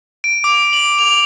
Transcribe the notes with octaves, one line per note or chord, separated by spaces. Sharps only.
D7
D6
F#7
F7